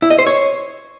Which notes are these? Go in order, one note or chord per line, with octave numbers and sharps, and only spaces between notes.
E4
D#5
C5
C#5